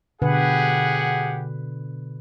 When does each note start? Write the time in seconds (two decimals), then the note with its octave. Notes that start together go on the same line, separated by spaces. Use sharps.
0.22 B2 D3 G4 G#4 B4 F#5